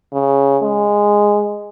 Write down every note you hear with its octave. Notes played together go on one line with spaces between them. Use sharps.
C#3
G#3